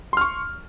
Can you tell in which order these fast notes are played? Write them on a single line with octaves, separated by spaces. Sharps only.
C6 F6 C#6